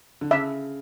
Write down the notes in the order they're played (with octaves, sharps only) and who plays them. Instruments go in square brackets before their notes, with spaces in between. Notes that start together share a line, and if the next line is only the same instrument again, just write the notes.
[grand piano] D3
[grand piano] C#3 [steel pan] E5